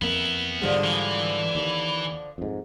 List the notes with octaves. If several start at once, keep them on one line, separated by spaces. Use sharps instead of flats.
F2 A#3 B3 E4
G#2 D3 F3 G3 G#3
E3
D#2
F2 G#2